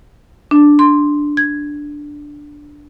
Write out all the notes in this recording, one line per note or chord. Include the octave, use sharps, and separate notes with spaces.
D4
C6
G#6